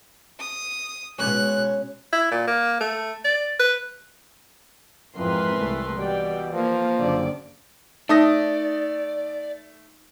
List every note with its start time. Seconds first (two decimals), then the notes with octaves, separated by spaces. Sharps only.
0.39 D#6
1.18 B2 G#3 C#4 F#6
2.13 E4
2.31 A#2
2.47 A#3
2.80 A3
3.25 D5
3.59 B4
5.16 F2 G#2 E3 A#4 B4 C6
5.56 C2 A3
5.96 B2 E3 G3 D5 G5
6.53 F3 A#3
6.98 F#1 D3 D5
8.09 A3 D#4 D5 D#6 A#6